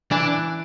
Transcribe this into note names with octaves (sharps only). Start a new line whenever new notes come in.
E3 D4